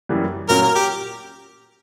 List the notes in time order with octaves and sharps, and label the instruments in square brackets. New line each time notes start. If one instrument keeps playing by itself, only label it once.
[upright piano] F#2 E3 G3
[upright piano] A#2 F#3 A#3 C#4 [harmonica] A#4
[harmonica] A#4
G4